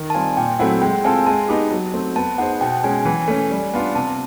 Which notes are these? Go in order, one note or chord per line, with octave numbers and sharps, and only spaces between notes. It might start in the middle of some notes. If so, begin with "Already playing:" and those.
Already playing: D#3
A5
G3 C4 F4 G#5
A#2 G5
F#3 A3 C4 E4 F#5
G#3 G5
C4 F4 A4 G#5
G#3 A5
B3 D#4 G4
F#3
A3 C4
B3 A5
D#4 G#4 C5 F#5
B2 G5
G#3 C#4 G#5
E3
A3 C#4
G3
B3 D4 F4
C3 A5